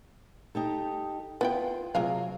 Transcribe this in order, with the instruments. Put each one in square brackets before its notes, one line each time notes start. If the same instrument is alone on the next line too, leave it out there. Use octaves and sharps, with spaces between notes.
[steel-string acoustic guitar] D#4 G4 A4
[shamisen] B3 E4 G5 [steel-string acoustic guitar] F4
[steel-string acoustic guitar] C3 F#3 [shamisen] G#3 F4 F5